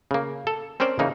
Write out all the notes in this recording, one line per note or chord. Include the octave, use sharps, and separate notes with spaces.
C#3 A#3
A4
C4 C#4 A#4 C5 D5
C#3 E3 A#3 D#4